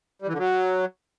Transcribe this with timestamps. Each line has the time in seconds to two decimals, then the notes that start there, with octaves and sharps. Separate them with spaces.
0.22 G3
0.28 E3
0.33 D3
0.39 F#3